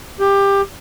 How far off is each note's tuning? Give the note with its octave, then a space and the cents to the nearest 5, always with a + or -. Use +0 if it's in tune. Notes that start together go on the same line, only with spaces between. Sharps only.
G4 +20